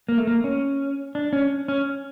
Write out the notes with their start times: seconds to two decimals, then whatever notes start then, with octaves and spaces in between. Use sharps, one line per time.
0.09 A#3
0.18 A3
0.27 A#3
0.44 C#4
1.15 D4
1.33 C#4
1.68 C#4